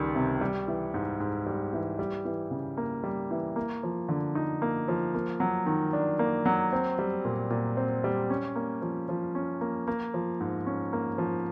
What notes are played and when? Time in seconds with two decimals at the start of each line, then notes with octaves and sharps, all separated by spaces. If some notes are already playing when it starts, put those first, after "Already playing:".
Already playing: C#2 D#3 G3
0.15 C3
0.41 G3
0.68 E3
0.94 G#2
1.20 G#2
1.47 G3
1.73 E3
1.99 G3
2.25 E3
2.51 C#3
2.77 A#3
3.04 G3
3.31 E3
3.56 A#3
3.83 F3
4.09 D3
4.35 D#4
4.62 A#3
4.88 F3
5.14 A#3
5.40 F#3
5.66 D#3
5.93 D4
6.19 A#3
6.45 F#3
6.73 C4
6.99 G3
7.25 A#2
7.50 A#2
7.77 C4
8.04 G3
8.30 C#4
8.56 A#3
8.82 F3
9.09 F3
9.35 C#4
9.61 A#3
9.88 A#3
10.14 F3
10.40 G#2
10.66 C#4
10.93 A#3
11.18 F3